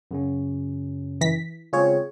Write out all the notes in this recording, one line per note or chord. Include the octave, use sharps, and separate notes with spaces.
F#2 C#3 C#4
E3 A#6 B6
C#3 G#3 C4 F4 G#4 C#5